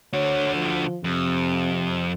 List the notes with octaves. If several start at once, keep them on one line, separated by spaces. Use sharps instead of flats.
D3 F#4 C#5
F3
F2 C3